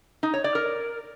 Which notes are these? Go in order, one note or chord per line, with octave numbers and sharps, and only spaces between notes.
D#4
C#5
D5
A#4